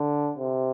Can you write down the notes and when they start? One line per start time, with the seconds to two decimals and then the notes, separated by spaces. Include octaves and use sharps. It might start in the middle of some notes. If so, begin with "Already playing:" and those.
Already playing: D3
0.38 C3